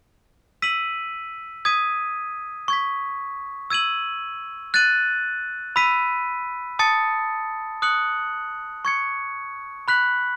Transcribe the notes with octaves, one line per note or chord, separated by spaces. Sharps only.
E6 B6 D#7 F#7
D#6 G#6 B6 D#7
C#6 G#6 B6
E6 G#6 D#7 F#7
F#6 A6 D#7 F#7
B5 E6 B6 D#7
A5 D#6 A6 C#7
D#6 F#6 C#7 F#7
C#6 G#6 C#7
B5 F#6 B6 F#7